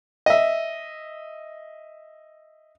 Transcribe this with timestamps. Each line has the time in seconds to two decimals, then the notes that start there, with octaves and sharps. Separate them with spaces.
0.26 D#5 E5